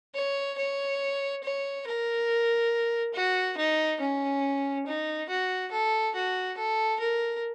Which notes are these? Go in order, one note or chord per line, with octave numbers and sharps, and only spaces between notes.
C#5
C#5
C#5
A#4
F#4
D#4
C#4
D#4
F#4
A4
F#4
A4
A#4